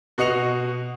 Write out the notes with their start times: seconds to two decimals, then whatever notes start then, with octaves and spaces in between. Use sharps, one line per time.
0.18 B2 F#4 D#5 C#7 F7